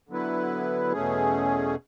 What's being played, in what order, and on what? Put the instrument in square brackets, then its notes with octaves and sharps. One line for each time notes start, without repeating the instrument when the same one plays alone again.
[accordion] D3 F#3 B3 E4 B4
E2 B2 A3 C#4 G#4